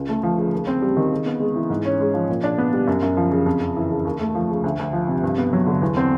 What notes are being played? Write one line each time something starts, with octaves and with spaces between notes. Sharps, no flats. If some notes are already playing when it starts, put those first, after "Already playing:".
Already playing: C#2
A3
F3
C#3
D#2
C4
G3
D#3
C#3
B3
G#3
E3
G#2
C#4
G#3
F3
A#2
D4
B3
G3
F#2
F#2
F3
C#3
F2
F2
E3
C#3
D#2
A3
F3
C#3
D2
D2
F3
C3
G2
B3
F#3
D3
E2
C4